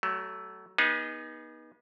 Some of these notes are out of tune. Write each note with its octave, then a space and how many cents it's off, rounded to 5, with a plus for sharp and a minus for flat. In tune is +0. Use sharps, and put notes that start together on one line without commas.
F#3 +30 A3 +0
B3 -35 D#4 +0 G#4 -20